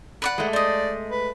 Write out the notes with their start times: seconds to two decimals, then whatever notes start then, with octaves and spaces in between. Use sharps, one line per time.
0.22 B4 D5 F#5
0.38 G#3 A3
0.53 C5 D5 D#5
1.10 B4